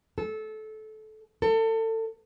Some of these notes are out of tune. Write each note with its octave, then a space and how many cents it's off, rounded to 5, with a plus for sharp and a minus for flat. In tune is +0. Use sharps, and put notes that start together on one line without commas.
A4 -20
A4 +30